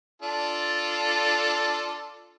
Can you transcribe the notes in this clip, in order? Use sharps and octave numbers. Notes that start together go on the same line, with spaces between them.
D4 F4 A4